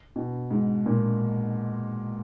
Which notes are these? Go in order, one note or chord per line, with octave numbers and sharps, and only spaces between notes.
B2
G#2
A#2